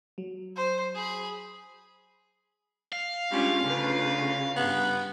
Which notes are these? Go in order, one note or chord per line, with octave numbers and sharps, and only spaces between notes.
F#3
C5
G#4 B5
F5
G3 G#3 C#4 D4 F4
D2 C#3 D4 F4 B4
G2 B3